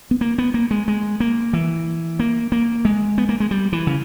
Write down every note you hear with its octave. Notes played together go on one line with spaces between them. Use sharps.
B3
A#3
B3
A#3
G#3
G#3
A#3
E3
A#3
A#3
G#3
B3
A#3
G#3
G3
E3
C#3